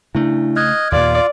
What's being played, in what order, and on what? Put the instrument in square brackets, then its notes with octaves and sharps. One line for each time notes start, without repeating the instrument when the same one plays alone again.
[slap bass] C#3 A3 [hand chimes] D4 E4
[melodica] D#5 [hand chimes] F6 F#6 G#6
[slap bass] D#2 A#2 [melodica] F4 [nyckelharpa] D5